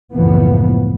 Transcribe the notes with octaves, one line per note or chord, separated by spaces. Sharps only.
F#1 C#2 A2 E3 F3 B3